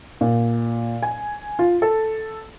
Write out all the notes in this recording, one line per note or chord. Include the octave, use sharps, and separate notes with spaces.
A#2
G#5
F4
A4